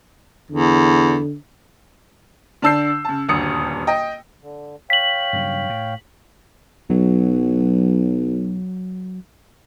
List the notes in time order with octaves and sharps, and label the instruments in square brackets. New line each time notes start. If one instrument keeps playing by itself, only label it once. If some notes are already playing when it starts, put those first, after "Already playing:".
[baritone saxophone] E2 [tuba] D3
[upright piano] D3 D4 A5 E6 G6 C7
C#3 A5
D#1 D2 G2 D#6 C#7
D#5 G5
[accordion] D3
[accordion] C#5 F5 G5 [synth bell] B6 F#7
[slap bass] G2 C#3 F#3
A2
[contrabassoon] B1 [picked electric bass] F#3